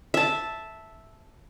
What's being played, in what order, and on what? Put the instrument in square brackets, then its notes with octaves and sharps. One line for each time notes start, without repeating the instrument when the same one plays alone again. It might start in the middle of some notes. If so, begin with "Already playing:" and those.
[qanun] E5 A5